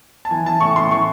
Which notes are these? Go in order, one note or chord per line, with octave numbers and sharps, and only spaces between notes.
A5
E3 G#5
E3 A5
A2 C#6
A2 C6
E3 C#6